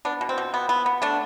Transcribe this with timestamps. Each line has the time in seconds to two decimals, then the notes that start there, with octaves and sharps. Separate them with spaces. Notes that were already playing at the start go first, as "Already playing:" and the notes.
0.05 B3 D4
0.21 B2
0.29 C4
0.38 B2
0.54 B3
0.69 B3
0.86 B3
1.02 A3 D4